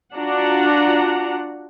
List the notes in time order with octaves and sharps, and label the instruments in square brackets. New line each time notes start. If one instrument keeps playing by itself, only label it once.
[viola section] D4 F4 F#4 F#5 A#5